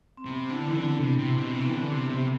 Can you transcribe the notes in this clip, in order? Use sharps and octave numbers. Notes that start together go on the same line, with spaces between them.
C4
C3 B3
D3 E4
E3
D3 D4
C3 B3
C3
B2 C4
C3
E3
D3 B3
C3 C4
C3 B3